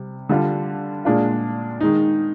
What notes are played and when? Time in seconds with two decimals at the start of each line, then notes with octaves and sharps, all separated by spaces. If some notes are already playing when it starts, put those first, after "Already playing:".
Already playing: C3 G3
0.29 D3 G3 D4 F4
1.05 A#2 G#3 D4 F4
1.81 D#3 G#3 D#4